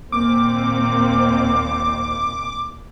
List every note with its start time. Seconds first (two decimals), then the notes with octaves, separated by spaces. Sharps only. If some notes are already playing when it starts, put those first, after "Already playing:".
0.12 D#2 A#2 A#3 C4 D6